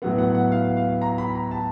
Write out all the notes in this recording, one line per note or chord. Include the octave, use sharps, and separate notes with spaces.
A2 F#3 B3 F#5
F#5
F#5
F5
F5
A#5
B5
A#5
A5